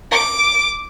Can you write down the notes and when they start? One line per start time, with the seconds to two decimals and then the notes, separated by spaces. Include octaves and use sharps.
0.11 D6